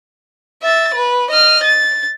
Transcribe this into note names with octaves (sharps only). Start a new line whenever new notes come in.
E5 A6
B4
D#5 F6
A6